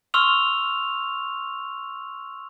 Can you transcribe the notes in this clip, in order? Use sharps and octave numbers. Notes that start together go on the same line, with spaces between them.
C6 C#6 E6 F6 F7